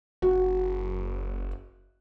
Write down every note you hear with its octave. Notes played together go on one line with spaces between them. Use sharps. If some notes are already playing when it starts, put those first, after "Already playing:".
F#1 F#4